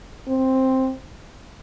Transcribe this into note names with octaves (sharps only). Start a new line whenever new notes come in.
C4